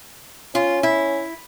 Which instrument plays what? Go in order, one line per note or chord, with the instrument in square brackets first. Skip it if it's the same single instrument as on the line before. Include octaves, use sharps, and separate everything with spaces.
[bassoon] C#4 [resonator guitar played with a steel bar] F4
[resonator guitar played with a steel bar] E4